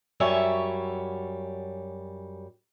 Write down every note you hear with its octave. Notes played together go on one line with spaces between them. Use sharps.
F#2 G3 C#5 E5 G#5